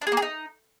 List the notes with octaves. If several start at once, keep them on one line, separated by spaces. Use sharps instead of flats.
D4
G#4
A#3
G#4
D#4